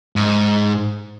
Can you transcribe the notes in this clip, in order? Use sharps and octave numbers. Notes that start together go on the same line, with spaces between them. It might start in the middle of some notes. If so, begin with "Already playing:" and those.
G#2